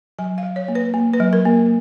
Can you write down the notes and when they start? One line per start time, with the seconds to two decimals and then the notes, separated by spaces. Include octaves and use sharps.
0.19 F#3 G#5
0.38 F5
0.43 F#3
0.56 C#5
0.68 A#3
0.75 B4
0.94 A#3
1.13 B4
1.20 F#3
1.33 A#4
1.45 A#3